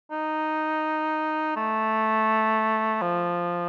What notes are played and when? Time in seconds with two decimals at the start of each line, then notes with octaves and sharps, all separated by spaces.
0.11 D#4
1.56 A3
3.02 F3